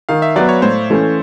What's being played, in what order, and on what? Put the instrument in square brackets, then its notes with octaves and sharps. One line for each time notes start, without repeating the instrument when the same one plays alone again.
[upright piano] D#3 [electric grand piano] F5
[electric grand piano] E5
[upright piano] F#3 B3 [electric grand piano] D5
[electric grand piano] C#5
[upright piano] A2 [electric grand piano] C5
[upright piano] E3 A3 C#4